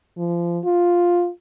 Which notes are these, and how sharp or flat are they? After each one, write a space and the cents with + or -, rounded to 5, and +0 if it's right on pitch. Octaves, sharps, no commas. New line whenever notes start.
F3 -25
F4 +5